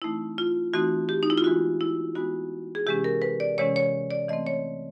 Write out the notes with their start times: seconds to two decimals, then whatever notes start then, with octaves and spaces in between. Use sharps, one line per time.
0.02 E3 A3 C4 D#4 E4
0.38 F4
0.73 E3 A3 C4 D#4 F#4
1.09 G4
1.23 D#4
1.30 E4
1.37 F4
1.44 E3 G#3 B3 D#4 F#4
1.81 E4
2.16 E3 G#3 B3 D#4 F#4
2.75 G#4
2.86 C3 E3 G#3 C#4 G4
3.04 A#4
3.22 B4
3.40 D5
3.58 C3 E3 G#3 C#4 C#5
3.76 C#5
4.11 D5
4.29 E3 A3 C4 D#5
4.47 C#5